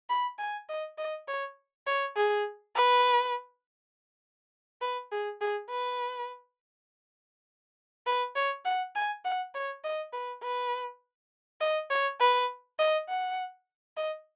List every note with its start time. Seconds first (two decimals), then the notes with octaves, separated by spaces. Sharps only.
0.10 B5
0.39 G#5
0.69 D#5
0.98 D#5
1.28 C#5
1.87 C#5
2.17 G#4
2.75 B4
4.82 B4
5.12 G#4
5.41 G#4
5.71 B4
8.07 B4
8.36 C#5
8.65 F#5
8.96 G#5
9.25 F#5
9.55 C#5
9.84 D#5
10.13 B4
10.43 B4
11.61 D#5
11.90 C#5
12.20 B4
12.79 D#5
13.09 F#5
13.97 D#5